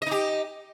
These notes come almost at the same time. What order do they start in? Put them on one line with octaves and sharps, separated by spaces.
D#5 D#4 G4